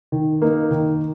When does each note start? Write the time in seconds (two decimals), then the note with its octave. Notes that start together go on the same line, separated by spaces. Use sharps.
0.12 D#3
0.42 A#3 D#4
0.71 D#3